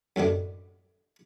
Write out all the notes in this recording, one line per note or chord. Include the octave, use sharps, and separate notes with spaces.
F#2 A2 D#3 D4